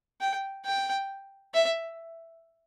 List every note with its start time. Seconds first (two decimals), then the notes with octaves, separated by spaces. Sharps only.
0.21 G5
0.65 G5
1.54 E5